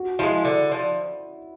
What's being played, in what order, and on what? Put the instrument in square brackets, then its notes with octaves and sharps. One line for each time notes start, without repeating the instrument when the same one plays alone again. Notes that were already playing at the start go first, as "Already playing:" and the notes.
Already playing: [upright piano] F#4
[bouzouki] F3 G#3 [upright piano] E4
[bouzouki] D3
F3